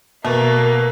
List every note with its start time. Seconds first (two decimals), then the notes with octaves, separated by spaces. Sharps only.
0.25 B2 A3 A#3